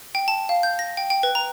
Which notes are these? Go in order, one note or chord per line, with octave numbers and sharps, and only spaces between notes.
G5
A5
F5
G6
A#6
G5
G5
B4
A#5